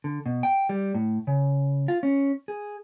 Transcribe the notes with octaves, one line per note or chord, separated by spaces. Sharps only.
D3
B2
G5
G3
A2
C#3
F4
C#4
G#4